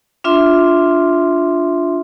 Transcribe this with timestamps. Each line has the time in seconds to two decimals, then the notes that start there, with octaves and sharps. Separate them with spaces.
0.24 D4 F4 E5 C6